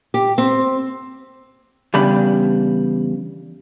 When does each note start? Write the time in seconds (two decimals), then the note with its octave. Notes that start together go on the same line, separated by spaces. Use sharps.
0.14 G4
0.38 C4
1.94 E2 C#3 G3 D4 B5